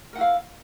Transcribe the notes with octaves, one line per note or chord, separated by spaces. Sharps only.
E4 A#4 F5 F#5